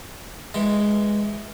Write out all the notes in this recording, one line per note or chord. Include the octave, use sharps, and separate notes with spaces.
E3 G#3